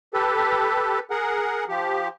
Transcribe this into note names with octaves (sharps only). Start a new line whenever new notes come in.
G4 A4 B4
G#4 A#4 F#5
F3 G4